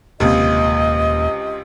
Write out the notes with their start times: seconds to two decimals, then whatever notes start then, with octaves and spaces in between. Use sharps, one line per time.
0.20 D#1 C#2 C3 A#3 D#5